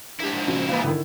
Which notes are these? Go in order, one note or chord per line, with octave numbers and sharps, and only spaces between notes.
G#2 A#3 D4 E4 G4
A2 F3
A#1 C#3 F#4
A#2 E3 A#3 B3 F5
D3 D#3 E4